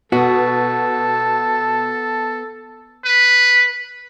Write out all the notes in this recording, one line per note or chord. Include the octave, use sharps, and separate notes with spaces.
B2 B3 F#4 A4 A5
B4